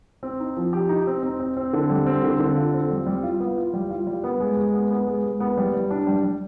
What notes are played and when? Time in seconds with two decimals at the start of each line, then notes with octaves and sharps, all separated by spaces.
0.23 C4
0.40 D#4
0.57 F3
0.73 G4
0.89 D#4
1.07 C4
1.23 C4
1.40 C4
1.57 C4
1.73 D3
1.90 G3
2.06 C4
2.23 D3
2.40 D3
2.57 F4
2.74 C4
2.91 G3
3.07 G3
3.23 F4
3.40 B3
3.57 F4
3.74 G3
3.90 F4
4.07 G3
4.24 B3
4.40 G#3
4.57 G#3
4.74 B3
4.90 B3
5.07 G#3
5.24 G#3
5.40 B3
5.58 G3
5.74 G3
5.91 D4
6.07 G3
6.23 G3